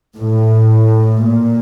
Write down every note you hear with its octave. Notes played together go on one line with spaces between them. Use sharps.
A2
A#2